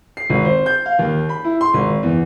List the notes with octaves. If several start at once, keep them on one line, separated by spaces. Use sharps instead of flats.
C7
G#1
C5
G6
F5
D#2
B5
E4
C6
G#1
E2